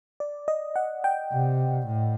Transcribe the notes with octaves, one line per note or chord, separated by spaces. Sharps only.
D5
D#5
F#5
G5
C3
A2